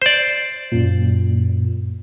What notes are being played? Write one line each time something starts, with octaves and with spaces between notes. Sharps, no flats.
C5 D5
F#2 A#2